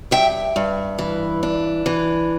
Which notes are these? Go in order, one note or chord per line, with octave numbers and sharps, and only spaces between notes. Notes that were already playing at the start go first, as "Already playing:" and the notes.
G2 E5 G5
G2
E3
D4
E3